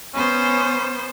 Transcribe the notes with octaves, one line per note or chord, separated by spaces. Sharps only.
B3 C#4 C5